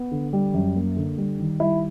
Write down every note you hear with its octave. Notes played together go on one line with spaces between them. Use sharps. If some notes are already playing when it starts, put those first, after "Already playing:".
Already playing: B3
D3
G3
F#2
A#3
D3
G3
D#3
G3 E4